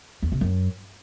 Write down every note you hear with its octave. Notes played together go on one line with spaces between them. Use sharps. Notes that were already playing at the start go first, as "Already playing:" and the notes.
E2
C3
F#2